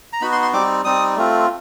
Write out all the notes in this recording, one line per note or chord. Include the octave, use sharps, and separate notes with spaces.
A#5
B3 D#4 F#4 B5
C6
C6
G3 C4 D#4 D6
G3 C4 D#4 D#6
A3 C4 F4